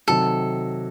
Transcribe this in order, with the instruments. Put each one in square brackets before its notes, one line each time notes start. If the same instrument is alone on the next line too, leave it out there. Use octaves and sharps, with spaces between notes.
[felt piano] C3 D#3 F#3 [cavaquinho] A4